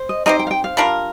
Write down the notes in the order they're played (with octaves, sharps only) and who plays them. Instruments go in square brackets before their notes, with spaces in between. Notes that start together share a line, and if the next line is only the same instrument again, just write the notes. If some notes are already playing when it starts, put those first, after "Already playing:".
Already playing: [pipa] C5
[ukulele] D#5
[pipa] C4 D#4 G4 C5 [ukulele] D#5
[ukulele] G5
F5
G5
F5
[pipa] G3 D4 F4 A#4